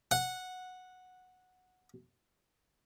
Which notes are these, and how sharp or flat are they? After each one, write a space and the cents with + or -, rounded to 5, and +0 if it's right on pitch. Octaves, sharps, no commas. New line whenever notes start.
F#5 -10